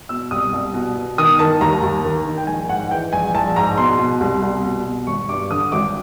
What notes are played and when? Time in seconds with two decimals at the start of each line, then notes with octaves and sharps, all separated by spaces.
0.09 B2 E6
0.31 C2 D#6
0.53 C2
0.74 B2
0.96 B2
1.18 D#3 D#6
1.39 D#3 A5
1.61 D#2 A#5
1.82 D#2
2.05 D#3
2.26 D#3
2.38 G5
2.47 A#1 G#5
2.69 G#2 F#5
2.91 E3 G5
3.13 A#1 G#5
3.34 A#1 A5
3.56 G#2 A#5
3.78 B2 C6
3.99 B2
4.20 C2
4.42 C2
4.64 B2
4.85 B2
5.07 G#1 C#6
5.29 G2 D6
5.51 D3 D#6
5.72 G#1 D6